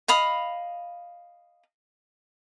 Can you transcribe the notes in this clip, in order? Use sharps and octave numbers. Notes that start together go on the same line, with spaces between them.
D#5 F5 B5 D#6